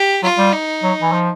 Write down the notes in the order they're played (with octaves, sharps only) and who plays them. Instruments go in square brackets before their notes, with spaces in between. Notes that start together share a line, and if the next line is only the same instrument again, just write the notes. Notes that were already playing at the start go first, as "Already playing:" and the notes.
Already playing: [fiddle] G4
[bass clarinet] F#3 [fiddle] F4
[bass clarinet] G3
[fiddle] D#4
[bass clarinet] F#3
E3
F3